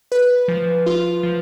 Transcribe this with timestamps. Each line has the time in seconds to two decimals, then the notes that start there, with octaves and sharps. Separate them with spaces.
0.12 B4
0.48 F3
0.86 F4
1.23 F3